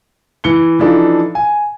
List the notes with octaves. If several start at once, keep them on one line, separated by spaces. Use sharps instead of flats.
E3 C#7 G7
E3 F3 D4 D#4 A4
G#5